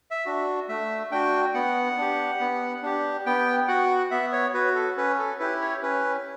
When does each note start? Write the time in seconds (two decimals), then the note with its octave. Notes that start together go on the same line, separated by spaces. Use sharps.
0.11 E5
0.26 D4 F#4
0.69 A3 E5
1.11 D4 F#4 G5
1.54 B3 F#5
1.97 D4 G4
2.40 B3
2.83 D4 G4
3.26 B3 G5
3.68 F#4 F#5
4.11 B3 E5
4.32 C#5
4.54 F#4 B4
4.75 A4
4.97 C#4 B4
5.19 A4
5.39 E4 G4 B4
5.61 C#5
5.83 C#4 B4